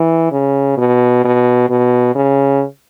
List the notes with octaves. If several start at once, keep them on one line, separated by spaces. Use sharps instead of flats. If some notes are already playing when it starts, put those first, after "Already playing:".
Already playing: E3
C#3
B2
B2
B2
C#3